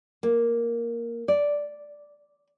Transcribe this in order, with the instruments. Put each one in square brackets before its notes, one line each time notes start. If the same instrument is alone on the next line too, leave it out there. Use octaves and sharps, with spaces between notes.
[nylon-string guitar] A#3
D5